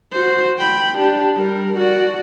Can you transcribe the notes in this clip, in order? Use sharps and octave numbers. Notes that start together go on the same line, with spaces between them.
F#4 C5
G5 B5
D4 G4
G3 A#4
F#4 D5